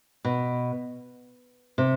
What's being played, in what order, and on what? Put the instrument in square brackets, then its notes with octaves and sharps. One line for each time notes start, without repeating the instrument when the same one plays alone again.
[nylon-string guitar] B2
C3